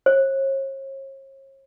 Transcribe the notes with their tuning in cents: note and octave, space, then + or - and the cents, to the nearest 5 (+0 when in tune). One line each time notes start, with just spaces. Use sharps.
C#5 -45